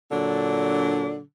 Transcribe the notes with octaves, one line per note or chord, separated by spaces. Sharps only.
A#2 D3 F#3 D4